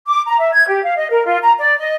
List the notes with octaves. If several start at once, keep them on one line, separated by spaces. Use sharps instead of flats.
D6
A#5
E5
G#6
G4
F5
D#5
A#4
F4
A#5
D5
D#5